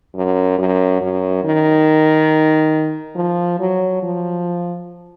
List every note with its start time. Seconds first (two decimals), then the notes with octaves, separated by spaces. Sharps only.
0.15 F#2
0.59 F#2
1.01 F#2
1.44 D#3
3.16 F3
3.59 F#3
4.03 F3